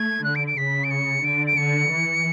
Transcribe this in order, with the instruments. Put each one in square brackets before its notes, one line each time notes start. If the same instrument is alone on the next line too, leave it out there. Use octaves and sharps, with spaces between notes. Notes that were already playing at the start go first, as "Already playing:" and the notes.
Already playing: [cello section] A3 [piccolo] G#6
[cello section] D3 [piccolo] F#6
[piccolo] D7
D7
[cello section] C#3 [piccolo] B6
[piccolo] D7
C#7
[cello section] D3 [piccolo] D7
[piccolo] D7
[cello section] D3 [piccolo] C#7
[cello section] E3